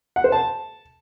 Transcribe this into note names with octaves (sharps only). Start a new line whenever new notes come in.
F#5
C5
A5